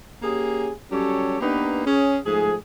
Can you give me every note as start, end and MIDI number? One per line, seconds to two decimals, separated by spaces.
0.22 0.71 58
0.22 0.71 61
0.22 0.71 67
0.22 0.71 68
0.92 1.39 54
0.92 1.39 55
0.92 1.39 61
0.92 1.39 67
0.92 1.39 69
0.92 1.39 73
1.40 1.83 58
1.40 1.83 59
1.40 1.83 62
1.40 1.83 63
1.40 1.83 67
1.40 1.83 71
1.85 2.18 61
1.85 2.18 68
2.25 2.55 44
2.25 2.55 53
2.25 2.55 57
2.25 2.55 68